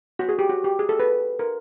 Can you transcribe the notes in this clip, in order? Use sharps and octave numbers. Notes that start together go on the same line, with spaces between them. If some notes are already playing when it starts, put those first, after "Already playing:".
F#4
G#4
G4
F#4
G4
G#4
A4
B4
A#4